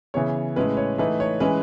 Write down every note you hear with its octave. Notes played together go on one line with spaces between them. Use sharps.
C#3 E3 B3 C#5
A2 G#3 C#4 B4
C#5
E3 A3 D#4 B4
C#5
E3 G#3 C#4 B4